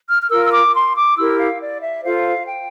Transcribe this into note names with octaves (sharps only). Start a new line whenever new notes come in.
F6
F6
F4 A#4 E6
E6
D6
C6
D6
E4 G4 A#4 E6
F5
D5
E5
F4 A4 C5 F5
G5